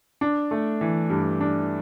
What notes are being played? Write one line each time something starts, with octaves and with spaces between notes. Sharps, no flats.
D4
A3
E3
G2
D4